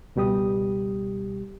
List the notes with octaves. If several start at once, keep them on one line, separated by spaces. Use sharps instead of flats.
C#2 B2 G3 G4 D#6